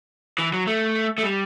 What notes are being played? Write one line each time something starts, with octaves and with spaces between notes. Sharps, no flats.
E3
F#3
A3
A3
G3